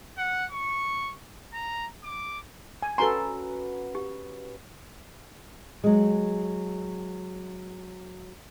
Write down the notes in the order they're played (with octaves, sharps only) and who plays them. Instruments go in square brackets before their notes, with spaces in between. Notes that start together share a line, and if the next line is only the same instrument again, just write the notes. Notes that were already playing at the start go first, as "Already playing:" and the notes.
[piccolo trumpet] F#5
C#6
A#5
D6
[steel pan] G#5
[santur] C#4 F#4 B4 [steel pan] A4 C6 [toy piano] G#5 A#5
[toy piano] G4
[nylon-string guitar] F#3 G#3